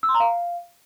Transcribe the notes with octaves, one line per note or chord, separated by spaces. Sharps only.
E6
C6
A#5
F5